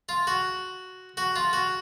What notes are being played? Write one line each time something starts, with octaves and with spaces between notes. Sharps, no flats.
F4
F#4
F#4
F4
F#4